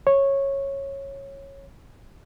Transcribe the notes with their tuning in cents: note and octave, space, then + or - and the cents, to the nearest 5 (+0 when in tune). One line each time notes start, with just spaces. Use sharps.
C#5 -10